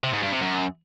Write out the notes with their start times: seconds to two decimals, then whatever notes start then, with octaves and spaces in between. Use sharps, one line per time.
0.04 C3
0.13 G#2
0.22 G2
0.32 C3
0.41 F#2